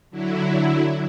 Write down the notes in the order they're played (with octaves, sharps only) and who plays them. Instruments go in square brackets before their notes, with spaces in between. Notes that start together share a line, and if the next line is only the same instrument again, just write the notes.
[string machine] D3 F#3 E4